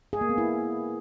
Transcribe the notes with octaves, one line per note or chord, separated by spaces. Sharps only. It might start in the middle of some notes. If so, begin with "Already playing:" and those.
G#4
A#3
B3
E4